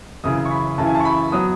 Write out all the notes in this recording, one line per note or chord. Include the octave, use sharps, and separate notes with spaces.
F#2 C#3 E3 D#6
C#6
B5
F#2 C#3 E3 A5
G#5
A5
C#6
B5
F#3 B3 D#6